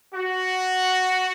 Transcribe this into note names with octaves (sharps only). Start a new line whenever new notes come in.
F#4